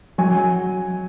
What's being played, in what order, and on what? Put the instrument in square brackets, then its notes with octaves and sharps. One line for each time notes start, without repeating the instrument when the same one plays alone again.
[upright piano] F#3 G#5